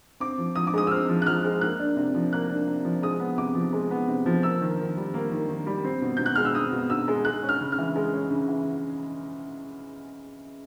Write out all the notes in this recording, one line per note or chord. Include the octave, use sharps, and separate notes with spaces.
C4 D6
F3
F3 D#6
D6
G#3 D#6
E6
C4 F6
F3
F#6
F3 F6
G#3
A#3 F#6
D4
C3
F3
A#3 F#6
D4
C3
F3
G#3 D#6
B3
C3 D6
F3
G#3
B3
C3
F3
A#3 E6
D#3
D#3
G3
A#3
D#3
D#3
G3
C4
B2
B2 G6
F#6
G#3 F6
E6
C4 D#6
B2
B2 E6
G#3
G#3 F#6
C#4
F6
C#3
F6
E3
G#3
C#4
C#3
E3